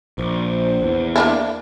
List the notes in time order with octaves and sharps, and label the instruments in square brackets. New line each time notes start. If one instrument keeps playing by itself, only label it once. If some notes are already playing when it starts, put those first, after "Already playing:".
[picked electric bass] A#1 [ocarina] C5
[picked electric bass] E2
[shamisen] A#3 D4 E4